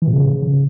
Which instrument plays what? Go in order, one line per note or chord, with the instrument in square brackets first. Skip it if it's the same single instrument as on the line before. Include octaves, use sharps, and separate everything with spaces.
[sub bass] E3
A#2
C#3